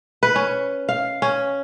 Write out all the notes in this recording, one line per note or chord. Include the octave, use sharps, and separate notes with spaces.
B4
C#4
F5
C#4